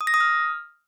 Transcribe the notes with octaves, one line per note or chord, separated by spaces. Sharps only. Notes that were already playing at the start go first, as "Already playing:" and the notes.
D#6
A#6
D#6
F6